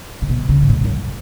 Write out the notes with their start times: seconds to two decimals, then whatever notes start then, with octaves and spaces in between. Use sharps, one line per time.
0.22 C#3
0.29 B2
0.49 C#3
0.62 G#2
0.70 A#2
0.84 F#2